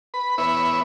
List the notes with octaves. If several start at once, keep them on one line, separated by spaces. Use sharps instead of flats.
B4 B5
B3 E4 B4 C#5 E5